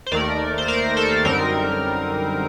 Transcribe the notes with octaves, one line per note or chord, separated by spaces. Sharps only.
C5
D#2 D#3 A3 A#4 D5
C5
A#4 D5
A4 C5
F#2 D3 G3 C4 D#4 A#4